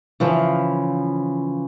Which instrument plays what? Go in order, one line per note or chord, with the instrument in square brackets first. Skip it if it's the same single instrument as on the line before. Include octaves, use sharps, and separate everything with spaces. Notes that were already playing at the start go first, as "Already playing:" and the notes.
[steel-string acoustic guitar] C#3 E3 F3